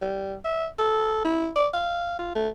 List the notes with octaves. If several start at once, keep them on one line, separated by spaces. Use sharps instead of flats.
G3
E5
A4
E4
D5
F5
F4
A3